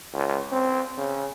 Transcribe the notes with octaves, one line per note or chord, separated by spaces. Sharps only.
C#2
C4
C#3